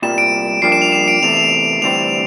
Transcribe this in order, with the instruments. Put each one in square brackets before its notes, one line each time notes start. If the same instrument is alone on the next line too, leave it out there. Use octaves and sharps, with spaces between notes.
[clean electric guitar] C2 A#2 G3 [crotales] E7
[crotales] D7
[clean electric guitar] G2 F3 A#3 D4 G4 [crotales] C7
[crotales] E7
F7
E7
D7
[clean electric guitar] E2 C3 E3 A3 [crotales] F7
[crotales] F7
[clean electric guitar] D2 C3 E3 G3 C4 [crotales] F7